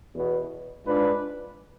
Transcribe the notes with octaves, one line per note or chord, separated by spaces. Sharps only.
E2 B2 B3
G#2 G#3 D4 F4 B4